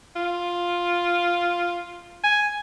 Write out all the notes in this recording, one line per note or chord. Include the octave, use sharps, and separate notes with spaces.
F4
G#5